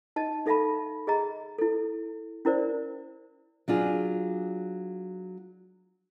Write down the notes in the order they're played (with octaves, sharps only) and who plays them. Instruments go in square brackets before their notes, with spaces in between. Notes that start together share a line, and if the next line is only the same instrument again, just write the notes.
[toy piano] D#4 D#5 A5
D#4 A4 E5 F5 A5 B5
G#4 D#5 A#5
E4 A4
C#4 E4 A#4 C5 D5
[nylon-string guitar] F#3 D4 F4 G#4